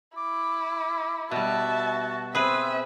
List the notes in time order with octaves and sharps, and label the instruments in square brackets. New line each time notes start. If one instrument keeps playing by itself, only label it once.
[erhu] E4 [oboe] D6
[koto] B2 G3 [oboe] F#4 [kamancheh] E5 A5
[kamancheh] C4 C5 [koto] G#4 B4 [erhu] E5